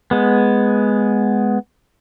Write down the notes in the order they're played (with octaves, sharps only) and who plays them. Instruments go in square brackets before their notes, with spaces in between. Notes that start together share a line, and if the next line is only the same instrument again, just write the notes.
[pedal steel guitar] G#3 B3